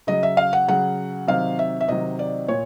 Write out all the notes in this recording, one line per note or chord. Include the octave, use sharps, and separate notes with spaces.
C#3 F#3 D#5
E5
F5
F#5
C#3 F#3 F#5
C3 D#3 F#3 F5
E5
E5
C3 D#3 F#3 D#5
D5
A#2 C#5